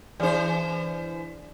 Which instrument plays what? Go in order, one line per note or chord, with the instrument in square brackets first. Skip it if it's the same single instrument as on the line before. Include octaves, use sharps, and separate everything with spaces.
[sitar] E3 C5 [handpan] D4 G#4 D5